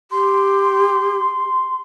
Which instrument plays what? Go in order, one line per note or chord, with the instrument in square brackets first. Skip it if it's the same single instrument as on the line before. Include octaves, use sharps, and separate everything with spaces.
[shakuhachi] G4 [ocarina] C6